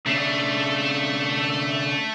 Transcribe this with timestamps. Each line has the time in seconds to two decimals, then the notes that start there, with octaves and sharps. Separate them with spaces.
0.06 C#3 A3 D4